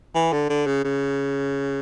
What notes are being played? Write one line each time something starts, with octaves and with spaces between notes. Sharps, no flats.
E3
D3
D3
C#3
C#3